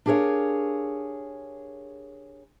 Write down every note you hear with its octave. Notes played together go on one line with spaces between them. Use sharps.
D4 G4 G#4 A#4 C#5 F5